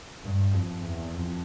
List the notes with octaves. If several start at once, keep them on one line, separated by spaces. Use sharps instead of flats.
G2
F2
E2
F2